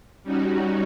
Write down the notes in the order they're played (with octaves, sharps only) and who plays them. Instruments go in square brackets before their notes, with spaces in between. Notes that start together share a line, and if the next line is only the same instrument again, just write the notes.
[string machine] G3 C#4 D#4 F#4